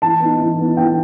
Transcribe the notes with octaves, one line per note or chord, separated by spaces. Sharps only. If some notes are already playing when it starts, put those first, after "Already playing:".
E3 A5
B3 D#4
E3
B3 D#4
E3 G5